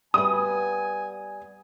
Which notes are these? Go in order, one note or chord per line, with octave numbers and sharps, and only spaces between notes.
G3 B3 G#5 D#6